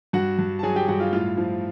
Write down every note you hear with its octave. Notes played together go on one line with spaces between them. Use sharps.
G2 F#4 F#5
G2
A5
F#3 G#4 G#5
G4 G5
G2 F#4 F#5
F4 F5
A2 F4 F5
F3